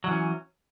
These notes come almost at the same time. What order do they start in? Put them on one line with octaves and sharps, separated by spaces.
F#3 E3 C#4